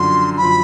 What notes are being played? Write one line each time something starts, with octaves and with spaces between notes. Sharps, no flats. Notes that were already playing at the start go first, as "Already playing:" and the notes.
Already playing: F#2 D3 F3 C6
F#2 D3 F3 B5